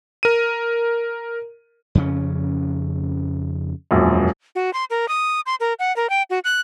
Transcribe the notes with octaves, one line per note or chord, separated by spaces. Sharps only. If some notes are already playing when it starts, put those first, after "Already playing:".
A#4 D#7
F2 C#3 C#4
E1 A#1 F#2
F#4
C6
A#4
D#6
C6
A#4
F#5
A#4
G5
F#4
F#6